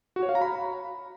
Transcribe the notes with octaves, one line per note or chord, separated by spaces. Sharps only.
F#4
C#5
F5
A#5
B5